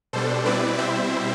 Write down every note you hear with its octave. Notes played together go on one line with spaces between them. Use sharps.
B2 G3 D4 A4 C5
B2 G3 C4 E4 B4 D5
B2 G3 C4 E4 C5 E5